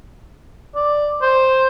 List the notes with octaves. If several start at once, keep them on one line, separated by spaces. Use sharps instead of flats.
D5
C5